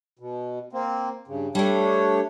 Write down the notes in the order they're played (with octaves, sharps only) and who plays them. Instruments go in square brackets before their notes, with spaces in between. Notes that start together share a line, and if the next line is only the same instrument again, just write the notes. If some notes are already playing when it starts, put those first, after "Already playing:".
[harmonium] B2
A#3 C4
G2 C#3
[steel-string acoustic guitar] G3 A3 [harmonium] D4 C#5